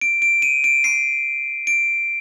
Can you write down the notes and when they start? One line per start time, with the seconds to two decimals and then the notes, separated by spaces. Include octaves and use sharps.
0.01 D7
0.22 D7
0.42 D#7
0.64 D7
0.84 C7
1.67 D7